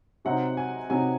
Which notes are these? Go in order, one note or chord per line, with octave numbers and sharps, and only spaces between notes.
C3 F#3 C4 D#4 F#5
G#5
C3 F#3 C4 D#4 G#5